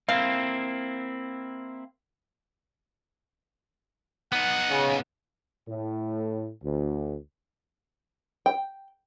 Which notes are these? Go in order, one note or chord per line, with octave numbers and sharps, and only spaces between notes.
A#3 C4 E4 F5
B3 D#4 F#5
C#3
A2
D2
G5